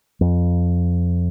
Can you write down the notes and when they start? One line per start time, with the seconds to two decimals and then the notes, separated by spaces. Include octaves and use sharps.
0.21 F2